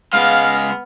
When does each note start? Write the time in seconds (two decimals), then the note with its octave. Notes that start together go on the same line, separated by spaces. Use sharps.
0.13 C#3 G#3 B3 F5 F6